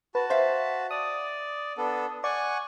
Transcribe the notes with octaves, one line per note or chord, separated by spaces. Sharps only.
F#4 B4 A5
C5 E5 F5
D5 D#6
B3 D4 A4
D5 F#5 G#5 C#6